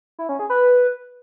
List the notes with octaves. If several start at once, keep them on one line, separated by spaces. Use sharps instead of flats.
E4
C#4
G#4
B4